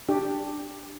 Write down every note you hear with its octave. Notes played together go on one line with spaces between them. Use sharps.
D4 G4